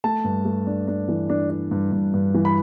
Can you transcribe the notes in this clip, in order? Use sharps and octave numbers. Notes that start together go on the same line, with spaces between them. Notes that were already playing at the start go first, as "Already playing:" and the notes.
A3 A5
G2
A3
D4
D4
E3
D4
D4
G2
G2
G2
E3
B5